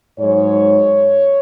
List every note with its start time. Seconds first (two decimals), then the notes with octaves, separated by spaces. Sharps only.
0.18 G#2 F#3 C#5